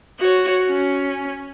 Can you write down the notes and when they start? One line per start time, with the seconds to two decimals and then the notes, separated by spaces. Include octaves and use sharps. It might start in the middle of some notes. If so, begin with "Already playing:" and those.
0.19 F#4 C#5
0.68 C#4